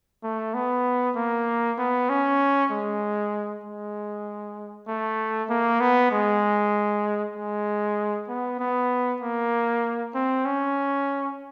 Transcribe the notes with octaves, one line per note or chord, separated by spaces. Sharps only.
A3
B3
A#3
B3
C#4
G#3
G#3
A3
A#3
B3
G#3
G#3
B3
B3
A#3
C4
C#4